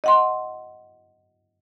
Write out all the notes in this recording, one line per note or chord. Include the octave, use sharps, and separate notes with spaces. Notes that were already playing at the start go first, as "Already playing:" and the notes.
D#5 F#5 C6